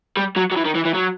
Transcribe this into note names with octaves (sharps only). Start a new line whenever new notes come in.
G3
F#3
F#3
E3
D#3
E3
E3
F#3